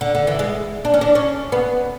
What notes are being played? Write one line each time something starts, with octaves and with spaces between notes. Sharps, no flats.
D3
D3
E3
G#3
D4
C#4
D4
C#4
B3